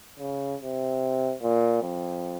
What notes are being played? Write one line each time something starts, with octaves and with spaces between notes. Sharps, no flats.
C#3
C3
A#2
F2